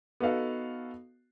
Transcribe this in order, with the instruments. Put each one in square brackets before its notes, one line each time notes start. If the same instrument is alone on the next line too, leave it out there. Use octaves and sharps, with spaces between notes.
[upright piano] B3 D#4 F#4 A4 F5